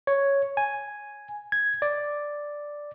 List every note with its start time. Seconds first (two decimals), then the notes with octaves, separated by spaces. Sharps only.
0.07 C#5
0.57 G#5
1.52 G#6
1.82 D5